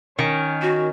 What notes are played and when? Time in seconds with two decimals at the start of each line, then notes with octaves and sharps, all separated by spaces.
0.19 D#3 C#4
0.62 F#4